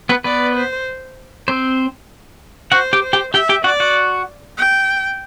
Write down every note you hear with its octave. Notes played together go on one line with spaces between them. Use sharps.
B3 B4
B3 B4 D5
C5
C4 C5
F#4 C5 F#5
G4 G5
C5
G4 G5
G4 E5 G5
G4 G5
F#4 D5 F#5
F#4 F#5
G5